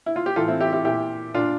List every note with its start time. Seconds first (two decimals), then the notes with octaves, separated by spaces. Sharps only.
0.06 E4
0.16 F4
0.26 G4
0.36 A2 E3 F4 A4
0.48 C4 E4
0.60 E4 G4
0.73 E4 G4
0.85 A#2 E4 G4
1.34 A#2 D4 F4